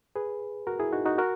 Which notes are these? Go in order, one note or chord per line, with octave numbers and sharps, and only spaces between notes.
G#4 B4
F#4 A#4
E4 G#4
D#4 F#4
D#4 F#4
F#4 A#4